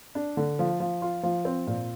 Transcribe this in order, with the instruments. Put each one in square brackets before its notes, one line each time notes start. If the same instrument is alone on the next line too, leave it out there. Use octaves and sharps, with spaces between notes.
[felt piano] D4
D3
F3
F3
F4
F3
C4
A#2